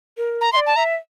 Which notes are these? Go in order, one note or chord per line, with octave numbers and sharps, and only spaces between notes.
A#4
A#5
E5 C6
D5
A5
E5 A#5